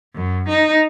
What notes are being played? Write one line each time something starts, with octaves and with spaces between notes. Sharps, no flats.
F#2
D#4